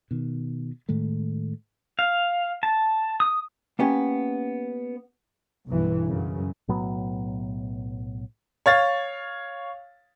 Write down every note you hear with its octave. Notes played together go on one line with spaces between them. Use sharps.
B2 D#3
A2 D#3 G#3 A3
F5
A5
D#6
A#3 B3 C#4 G4
B1 G2 E3
F#2 C#3
B1 A2 F#3 B3
C#5 F5 A6